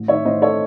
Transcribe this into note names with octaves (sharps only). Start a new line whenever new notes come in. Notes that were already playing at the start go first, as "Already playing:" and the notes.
Already playing: A1
D#3 C#5 E5
A1 C5 D#5
A4 C#5